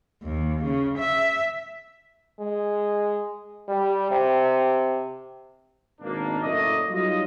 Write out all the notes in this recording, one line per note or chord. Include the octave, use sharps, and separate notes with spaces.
D#2
C#3
E5
G#3
G3
C3
G#1 B2 A#3 D4
F#1 A2 A3 A#3 D5 D#5
F#3 G3 D#4 F4 D#5